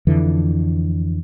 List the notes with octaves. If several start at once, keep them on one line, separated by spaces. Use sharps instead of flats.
F2 D3 E3